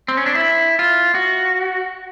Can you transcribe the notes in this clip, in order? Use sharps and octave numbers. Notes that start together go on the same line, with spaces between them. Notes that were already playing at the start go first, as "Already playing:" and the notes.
C4
C#4
D4
E4
F4
F#4